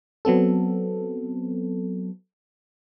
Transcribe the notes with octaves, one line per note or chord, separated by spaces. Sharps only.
F#3 B3 C4 A4